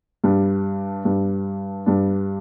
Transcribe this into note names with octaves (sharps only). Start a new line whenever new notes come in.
G2 G3 D4
G2 G3 D4
G2 G3 D4